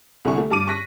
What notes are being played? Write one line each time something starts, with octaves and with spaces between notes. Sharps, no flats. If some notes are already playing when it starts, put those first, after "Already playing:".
C2 D3 E4 G#5 C#6
A3
G2 A5 D6 D#7
C#6 F#6 A#6 B6